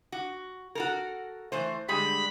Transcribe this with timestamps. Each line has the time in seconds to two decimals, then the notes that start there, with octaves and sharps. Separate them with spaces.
0.12 F#4
0.75 F#4 A4 A#4
1.52 E3 A3 C5
1.88 D3 G3 G#3 B5